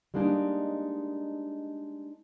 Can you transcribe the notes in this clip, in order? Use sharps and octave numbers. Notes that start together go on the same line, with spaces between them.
G3 G#3 A#3 D4 D#4